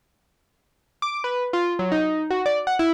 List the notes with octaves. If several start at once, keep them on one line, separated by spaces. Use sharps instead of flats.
D6
B4
F4
F#3
D#4
F#4
D5
F#5
E4